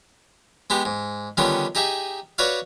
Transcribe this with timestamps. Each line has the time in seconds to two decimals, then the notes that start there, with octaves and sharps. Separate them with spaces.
0.70 G#3 B3 G4
0.85 G#2
1.37 D3 D#3 G3 B3 C#4 F4
1.75 D#4 G4 G#4 E5
2.38 F#4 B4 C#5 D5 F5